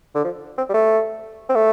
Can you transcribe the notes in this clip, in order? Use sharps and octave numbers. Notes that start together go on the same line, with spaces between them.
D3
F3
C4
G3
A3
C4
A3